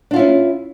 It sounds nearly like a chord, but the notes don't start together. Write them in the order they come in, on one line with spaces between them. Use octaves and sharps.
D4 F4 E4 C#4